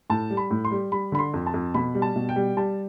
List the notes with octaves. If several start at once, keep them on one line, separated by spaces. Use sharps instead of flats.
A2 A5
G3
B5
A2
C6
G3
G3 B5
D3 B5
C6
F2
A5
F2
B2 B5
G3
A5
B2
G5
G3
G3 A5